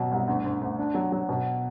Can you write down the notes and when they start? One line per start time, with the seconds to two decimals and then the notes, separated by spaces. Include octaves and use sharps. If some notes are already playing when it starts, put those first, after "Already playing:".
Already playing: B2 F#3
0.12 C2
0.28 D2
0.45 D2
0.62 D2
0.79 D4
0.95 F#3
1.12 F#3
1.29 B2